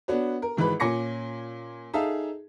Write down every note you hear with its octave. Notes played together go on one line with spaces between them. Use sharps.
B3 D4 F#4 C#5
A#4
G#1 E3 G#3 B4 B5
A#2 C#4 G#5 D6 A#6 C#7
D#4 G#4 A4 E5 F5 A5